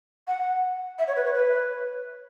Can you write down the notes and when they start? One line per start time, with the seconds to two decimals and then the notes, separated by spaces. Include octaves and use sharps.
0.28 F#5
0.99 E5
1.07 C#5
1.16 B4
1.25 C#5
1.35 B4